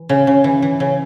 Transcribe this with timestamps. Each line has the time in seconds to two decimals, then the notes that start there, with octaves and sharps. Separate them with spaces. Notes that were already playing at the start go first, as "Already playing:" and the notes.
Already playing: E3
0.09 C#3
0.27 C#3
0.44 E3
0.62 E3
0.80 C#3